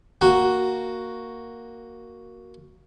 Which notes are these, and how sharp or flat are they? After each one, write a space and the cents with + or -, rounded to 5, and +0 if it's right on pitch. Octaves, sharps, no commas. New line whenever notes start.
A#3 +0 F#4 +0